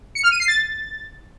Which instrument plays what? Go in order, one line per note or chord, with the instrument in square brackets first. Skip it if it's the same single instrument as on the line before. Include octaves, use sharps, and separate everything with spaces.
[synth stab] C#7
F6
D#7
C7
A6